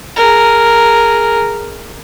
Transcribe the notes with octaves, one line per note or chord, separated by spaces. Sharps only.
G#4 A#4